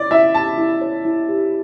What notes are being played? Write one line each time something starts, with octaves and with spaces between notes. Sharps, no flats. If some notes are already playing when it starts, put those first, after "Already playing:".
Already playing: E4 C#5 D5
E4 E5
G4 A5
E4
C#5
E4
G4